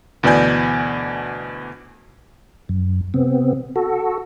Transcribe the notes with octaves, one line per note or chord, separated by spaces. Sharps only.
D2 B2 E3 D5 G#5 G6
F#2
C3 B3 C4
F#4 A4